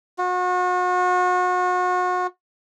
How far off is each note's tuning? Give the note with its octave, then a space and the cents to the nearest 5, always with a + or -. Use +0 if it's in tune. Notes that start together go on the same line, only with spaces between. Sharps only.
F#4 -35